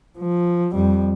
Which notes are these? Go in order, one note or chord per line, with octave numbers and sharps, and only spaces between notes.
F3
F2 G3